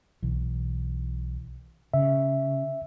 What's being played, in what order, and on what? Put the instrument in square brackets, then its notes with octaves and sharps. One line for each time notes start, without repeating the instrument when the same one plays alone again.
[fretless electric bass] B1 E3
[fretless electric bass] C#3 [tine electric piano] E5